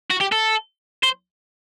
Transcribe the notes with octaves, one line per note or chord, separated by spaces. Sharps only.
F#4
G4
A4
C5